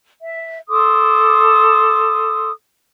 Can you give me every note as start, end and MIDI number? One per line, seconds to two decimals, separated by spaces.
0.23 0.59 76
0.69 2.51 69
0.69 2.51 84
0.69 2.51 86
0.69 2.51 87